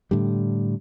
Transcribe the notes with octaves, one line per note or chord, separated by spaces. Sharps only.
A2 D3 G3